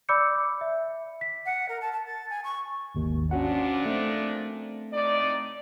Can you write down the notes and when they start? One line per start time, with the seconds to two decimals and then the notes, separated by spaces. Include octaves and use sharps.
0.09 D5 B5 D6 E6 G6 C#7
0.61 E5
1.21 B6
1.46 F#5
1.69 A#4
1.81 A5
1.93 A5
2.05 A6
2.30 G#5
2.44 C#6
2.95 G#1 D#2
3.31 A#2 F3 C#4 D4 F#4 F#5
3.86 A3 C4
4.92 A2 D#4 D5